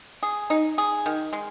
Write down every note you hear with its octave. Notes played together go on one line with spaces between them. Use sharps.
G#4
D#4
G#4
D#3
G#3